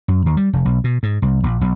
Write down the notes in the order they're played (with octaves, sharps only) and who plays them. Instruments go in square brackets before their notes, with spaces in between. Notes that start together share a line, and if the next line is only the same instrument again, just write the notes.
[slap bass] F#2
D#2
G3
F1
B1
B2
G#2
C2
A#1
B1